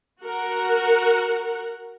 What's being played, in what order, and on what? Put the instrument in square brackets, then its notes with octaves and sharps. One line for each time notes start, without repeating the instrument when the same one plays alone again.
[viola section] F#4 A#4 F#5